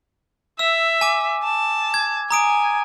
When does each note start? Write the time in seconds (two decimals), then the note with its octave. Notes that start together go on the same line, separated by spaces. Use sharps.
0.59 E5 E6
1.01 G#5 D6
1.43 A5
1.94 G#6
2.31 G#5 A#5 D#6 D7